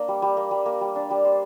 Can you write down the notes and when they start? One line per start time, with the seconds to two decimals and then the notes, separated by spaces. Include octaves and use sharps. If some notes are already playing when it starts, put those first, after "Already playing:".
Already playing: A#3 D4
0.08 G3
0.22 G3
0.37 A#3
0.51 G3
0.66 A#3
0.81 G3
0.96 D4
1.10 G3
1.25 C5